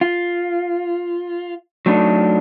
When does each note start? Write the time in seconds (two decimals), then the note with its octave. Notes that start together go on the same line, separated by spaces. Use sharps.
0.01 F4
1.86 F#3 A3 D4 D#4